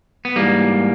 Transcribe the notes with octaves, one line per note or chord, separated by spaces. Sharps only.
B3
G#2 E3 G3 A#3